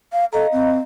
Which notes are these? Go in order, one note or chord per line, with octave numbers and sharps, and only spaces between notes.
F5
A4 D#5 F5 A#5
C4